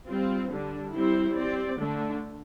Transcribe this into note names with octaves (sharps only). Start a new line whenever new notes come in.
G3 C4 F4
D3 G3 D4
G3 C4 E4 G4 C5
C4 G4 D5
D3 A3 D4